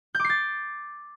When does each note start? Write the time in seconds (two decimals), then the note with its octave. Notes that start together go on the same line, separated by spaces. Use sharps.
0.15 G6
0.20 D6
0.24 C7
0.29 A6